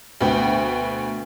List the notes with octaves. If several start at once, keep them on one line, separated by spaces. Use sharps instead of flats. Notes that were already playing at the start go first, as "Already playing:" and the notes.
D2 B2 B3 G5